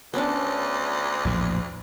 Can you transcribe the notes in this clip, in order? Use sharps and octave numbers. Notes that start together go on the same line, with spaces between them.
D2 B3 C#4 D4
A#1 E2 A2